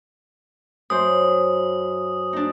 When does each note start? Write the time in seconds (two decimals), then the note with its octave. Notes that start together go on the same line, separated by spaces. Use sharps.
0.90 F#2 C5 D#6
2.33 D4 D#4